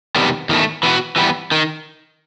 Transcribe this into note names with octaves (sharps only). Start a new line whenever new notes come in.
E2 C3 D#3 G3 B3
E2 D#3 A3
E3 B3 D#4 F#4
E3 G3 B3
D#3